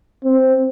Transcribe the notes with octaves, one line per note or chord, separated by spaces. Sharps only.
C4